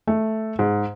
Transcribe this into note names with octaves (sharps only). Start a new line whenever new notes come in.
A3
G#2